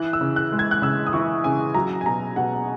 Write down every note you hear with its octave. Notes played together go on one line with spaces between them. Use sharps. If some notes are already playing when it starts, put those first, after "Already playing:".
Already playing: E3 F#6
E6
C#3
F#6
G#3
G#6
F#6
C#3 E6
D#6
E3 C#6
C#3 G#5
F#3 A#5
G#5
B2 A#5
B2 F#5